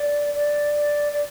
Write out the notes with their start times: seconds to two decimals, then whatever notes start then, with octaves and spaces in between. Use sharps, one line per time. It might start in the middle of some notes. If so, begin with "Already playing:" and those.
Already playing: D5
0.34 D5
1.13 D5